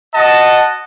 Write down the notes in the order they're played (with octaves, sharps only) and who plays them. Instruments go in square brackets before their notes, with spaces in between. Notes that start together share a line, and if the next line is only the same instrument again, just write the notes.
[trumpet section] F#4 D#5 F#5 A5